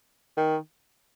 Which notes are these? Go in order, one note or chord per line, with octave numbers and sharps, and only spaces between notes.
D#3